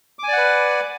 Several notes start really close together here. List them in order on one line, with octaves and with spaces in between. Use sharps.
D6 G#5 D5 F#5 B4